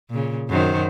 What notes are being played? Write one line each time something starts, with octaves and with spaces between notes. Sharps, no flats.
A#2 C#3
F#2 D#3 C5